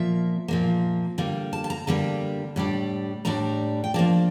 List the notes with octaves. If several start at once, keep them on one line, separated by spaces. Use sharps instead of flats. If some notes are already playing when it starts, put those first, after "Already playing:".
Already playing: A#2 F3 A#3 E5
A#2 F3 A#3
D3 G3 A#3
A5
A5
A#5
D3 G3 A#3 A5
A2 G3 D4
A2 G3 D4 A#5
G5
F3 A#3 D4 A5